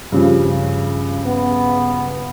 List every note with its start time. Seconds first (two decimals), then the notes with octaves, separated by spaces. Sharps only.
0.12 G2 C#3 F3
1.26 B3